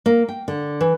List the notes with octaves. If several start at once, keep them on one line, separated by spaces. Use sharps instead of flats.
A#3
G5
D3
E3